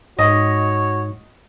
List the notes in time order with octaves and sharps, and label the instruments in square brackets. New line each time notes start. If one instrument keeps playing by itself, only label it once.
[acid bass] G#2 [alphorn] F#4 [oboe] C#5 [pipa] D#5